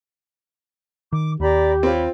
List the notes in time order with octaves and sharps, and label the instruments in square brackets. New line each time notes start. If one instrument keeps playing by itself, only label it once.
[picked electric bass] D#3 [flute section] D6
[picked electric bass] D#2 [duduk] G4 [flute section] D5 A#5 B5
[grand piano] C4 F4 [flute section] C#5 B5